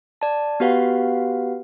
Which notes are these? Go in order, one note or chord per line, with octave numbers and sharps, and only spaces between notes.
D5 A5
B3 F#4 G4 B4 F5 F#5